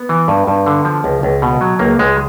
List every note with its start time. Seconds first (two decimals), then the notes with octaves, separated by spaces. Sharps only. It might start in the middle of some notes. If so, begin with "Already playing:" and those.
Already playing: B3
0.09 E3
0.28 G2
0.47 G2
0.66 D3
0.85 F3
1.04 C#2
1.23 C#2
1.42 B2
1.61 F#3
1.79 C#2 A#3
1.99 C#2 G#3